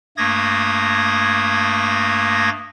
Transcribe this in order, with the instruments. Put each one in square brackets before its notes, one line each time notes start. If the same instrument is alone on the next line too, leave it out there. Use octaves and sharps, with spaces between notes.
[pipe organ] G2 A3 A#3 D#6 G#6 A#6